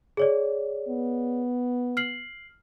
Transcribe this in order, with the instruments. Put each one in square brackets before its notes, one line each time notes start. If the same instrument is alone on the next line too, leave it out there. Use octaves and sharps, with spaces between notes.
[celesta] G#4 C#5 D5
[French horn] B3
[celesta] F6 C7 F#7